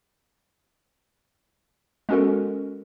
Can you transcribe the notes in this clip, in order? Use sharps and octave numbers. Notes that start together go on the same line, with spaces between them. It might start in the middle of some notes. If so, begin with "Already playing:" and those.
G#3 B3 C#4 F#4 A4 A#4